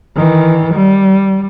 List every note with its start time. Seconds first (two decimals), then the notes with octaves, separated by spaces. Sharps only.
0.16 D#3 E3
0.75 G3